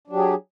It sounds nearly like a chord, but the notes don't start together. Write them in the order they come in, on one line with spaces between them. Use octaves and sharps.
D4 F#3 G4 G#4